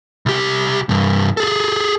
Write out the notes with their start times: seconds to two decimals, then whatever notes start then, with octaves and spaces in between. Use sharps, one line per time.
0.26 C2 G4
0.89 C2 G2
1.37 G#4 A4